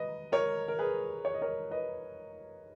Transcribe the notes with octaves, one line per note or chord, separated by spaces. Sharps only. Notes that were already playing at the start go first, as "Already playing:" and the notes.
Already playing: B4 D#5
A#4 C#5
A#4
G#4 B4
C#5
D#5
A#4 C#5
B4 D#5